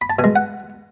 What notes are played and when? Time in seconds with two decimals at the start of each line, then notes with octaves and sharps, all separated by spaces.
0.01 B5
0.10 A5
0.19 B2 G#5
0.24 G#3
0.36 F#5